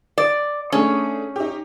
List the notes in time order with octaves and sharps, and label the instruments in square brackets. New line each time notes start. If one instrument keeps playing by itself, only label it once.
[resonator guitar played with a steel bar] D5
[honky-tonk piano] A3 D4 G#4 [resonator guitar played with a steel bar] C#4
[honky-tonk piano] D#4 G4